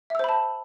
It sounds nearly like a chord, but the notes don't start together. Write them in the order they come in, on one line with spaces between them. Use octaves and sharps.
E5 E6 C5 B5 A5